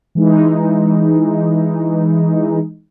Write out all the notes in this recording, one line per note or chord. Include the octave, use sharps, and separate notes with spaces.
E3 G#3 D#4